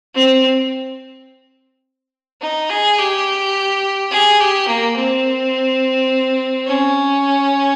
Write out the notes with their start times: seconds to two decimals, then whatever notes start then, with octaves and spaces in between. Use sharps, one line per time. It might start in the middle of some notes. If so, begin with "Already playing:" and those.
0.14 C4
2.41 D#4
2.70 G#4
2.98 G4
4.11 G#4
4.40 G4
4.68 A#3
4.97 C4
6.67 C#4